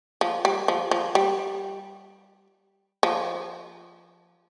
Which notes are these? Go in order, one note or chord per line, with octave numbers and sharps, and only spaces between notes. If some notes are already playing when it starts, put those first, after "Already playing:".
F3
G3
F3
F3
G3
F3